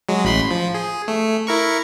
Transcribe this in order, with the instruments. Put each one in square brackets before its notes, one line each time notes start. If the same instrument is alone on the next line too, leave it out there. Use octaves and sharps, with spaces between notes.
[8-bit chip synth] F#3 G#3
A1 B5 C6
F3
G#4
A3
E4 A#4 C#6